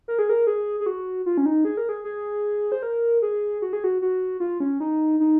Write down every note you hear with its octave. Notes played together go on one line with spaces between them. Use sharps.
A#4
G#4
A#4
G#4
G#4
F#4
F4
C#4
D#4
G#4
A#4
G#4
G#4
C5
A#4
G#4
F#4
G#4
F#4
F#4
F4
C#4
D#4
D#4